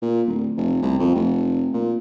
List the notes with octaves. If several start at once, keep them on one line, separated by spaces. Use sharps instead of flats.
A#2
D1
F1
C2
F2
F1
A#2